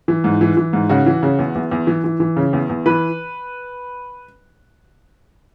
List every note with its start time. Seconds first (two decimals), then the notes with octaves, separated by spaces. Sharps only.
0.08 E3
0.24 G#2
0.41 E3
0.57 E3
0.73 G#2
0.89 C#3 F#4
1.06 E3
1.23 C#3
1.39 E2
1.55 E2
1.71 E2
1.87 E3
2.04 E3
2.20 E3
2.37 C#3
2.53 E2
2.69 E2
2.86 E3 B4